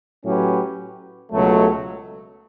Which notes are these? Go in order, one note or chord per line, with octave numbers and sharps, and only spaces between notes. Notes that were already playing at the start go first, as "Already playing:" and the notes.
A2 F#3 C#4 G4 B4
C#2 B2 F#3 A3